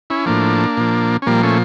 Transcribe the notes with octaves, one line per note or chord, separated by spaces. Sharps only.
C#4 E4
A2 F3 A#3 D4
A#2 F3
C#4
A#2 F3 G3 A#3
A3 C#4